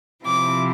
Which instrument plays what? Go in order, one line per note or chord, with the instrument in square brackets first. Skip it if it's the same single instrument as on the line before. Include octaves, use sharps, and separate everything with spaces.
[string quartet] C3 F3 C4 E4 D6